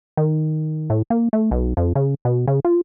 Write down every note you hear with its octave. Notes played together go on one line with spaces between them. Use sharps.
D#3
A2
A#3
A3
B1
F2
C#3
B2
C#3
F4